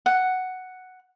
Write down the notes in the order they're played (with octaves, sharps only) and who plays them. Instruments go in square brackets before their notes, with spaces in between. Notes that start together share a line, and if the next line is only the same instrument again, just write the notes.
[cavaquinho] F#5